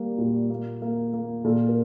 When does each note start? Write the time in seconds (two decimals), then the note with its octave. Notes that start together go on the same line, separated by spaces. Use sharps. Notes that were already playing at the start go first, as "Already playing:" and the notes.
Already playing: G3 A#3
0.18 A#2
0.50 A#3
0.82 A#3
1.13 A#3
1.44 A#2 A4
1.69 A#4